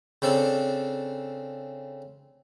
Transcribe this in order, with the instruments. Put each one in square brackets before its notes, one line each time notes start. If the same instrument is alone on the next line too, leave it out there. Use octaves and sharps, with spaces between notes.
[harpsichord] C#3 C4 D4 A4